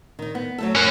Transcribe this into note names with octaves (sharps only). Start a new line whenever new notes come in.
D#3 D#4
B3
F#3 A3 A4
C#4 A#4 F#5